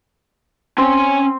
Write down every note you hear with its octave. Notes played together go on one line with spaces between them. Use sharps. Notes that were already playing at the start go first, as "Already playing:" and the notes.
C4 C#4 G#5